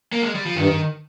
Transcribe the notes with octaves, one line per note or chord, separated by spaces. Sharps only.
A#3
G#3
G3
F3
G2 D#3